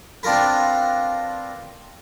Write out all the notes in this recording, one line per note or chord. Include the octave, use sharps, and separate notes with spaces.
C4 D4 F4 A#4 B4